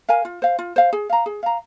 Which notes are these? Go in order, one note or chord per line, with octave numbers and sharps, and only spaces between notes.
A#4 F5 G#5
F4
C5 F5
F4
C5 F5
G#4
F5 A#5
G#4
F5 A#5